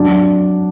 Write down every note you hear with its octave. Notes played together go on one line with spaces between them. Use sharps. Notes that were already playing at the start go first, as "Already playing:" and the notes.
Already playing: F#3 D4